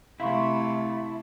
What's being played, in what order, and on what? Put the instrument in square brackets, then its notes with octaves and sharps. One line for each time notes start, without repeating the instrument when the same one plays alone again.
[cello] C3 A3 [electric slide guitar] E4 [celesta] F5 C6 C#6